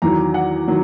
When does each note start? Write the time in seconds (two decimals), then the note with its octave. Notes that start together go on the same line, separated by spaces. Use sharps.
0.02 E2 D#3 F#3 A#5
0.34 F#5
0.68 D#3 F#3